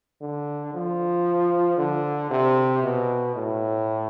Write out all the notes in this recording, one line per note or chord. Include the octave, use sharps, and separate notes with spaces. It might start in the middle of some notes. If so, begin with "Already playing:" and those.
D3
F3
D3
C3
B2
A2